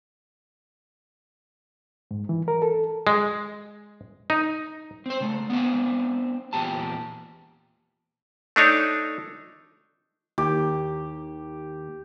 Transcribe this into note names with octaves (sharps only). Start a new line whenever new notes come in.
G#2
E3
A#4
A4
G#3
D#4
C4 C5
C#3 A3
B3 C4 D4 E5 F5
E2 A#2 G4 A5
A3 D4 D#4 C#5
D#2 G4